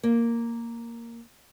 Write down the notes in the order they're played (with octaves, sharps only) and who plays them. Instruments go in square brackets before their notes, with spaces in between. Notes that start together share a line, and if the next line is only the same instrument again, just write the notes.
[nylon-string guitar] A#3